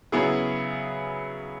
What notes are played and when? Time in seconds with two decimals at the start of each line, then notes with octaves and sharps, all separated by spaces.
0.12 C#3 F#3 B3 E4 G#4